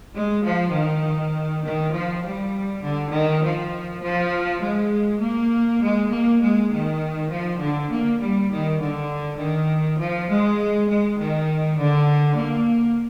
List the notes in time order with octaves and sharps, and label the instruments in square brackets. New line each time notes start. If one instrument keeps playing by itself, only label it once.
[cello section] G#3
F3
D#3
D#3
F3
G3
D3
D#3
F3
F3
G#3
A#3
G#3
A#3
G#3
D#3
F3
D3
A#3
G3
D#3
D3
D#3
F3
G#3
G#3
D#3
D3
A#3